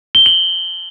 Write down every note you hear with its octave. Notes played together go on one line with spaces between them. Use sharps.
G7
F#7